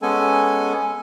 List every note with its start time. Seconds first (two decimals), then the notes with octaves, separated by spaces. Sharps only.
0.02 G#3 B3 C#4 A4 G#5